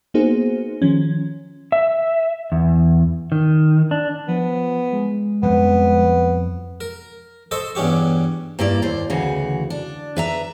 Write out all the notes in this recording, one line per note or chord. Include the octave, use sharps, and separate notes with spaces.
A#3 B3 D#4 F#4 G#4 C5
D#3 F3 C#4
E5
E2
D#3
D4
F3 B3
G#3
F2 F3 G3 B3
A#4
A4 C5 D#5 C6 C#6
E2 G2 C#4 G4 C#6
G2 A#3 E4 D5
D#2 C5
D2 C#3 E3 F#4
D4
B4 E5 A#5